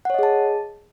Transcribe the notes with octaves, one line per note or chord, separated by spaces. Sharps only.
G#4 C#5 D#5 F#5 A5